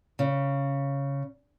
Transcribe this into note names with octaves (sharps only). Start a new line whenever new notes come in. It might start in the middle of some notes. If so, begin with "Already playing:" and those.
C#3